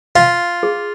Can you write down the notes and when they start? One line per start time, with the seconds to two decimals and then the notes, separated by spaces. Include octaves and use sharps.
0.15 F4 F5
0.63 G#4